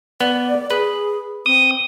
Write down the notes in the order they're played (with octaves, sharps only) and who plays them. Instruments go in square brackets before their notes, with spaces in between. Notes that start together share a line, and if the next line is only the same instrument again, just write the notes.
[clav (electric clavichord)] B3 [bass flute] D5
[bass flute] G#4 [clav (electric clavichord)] B4
[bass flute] C4 [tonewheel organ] D#6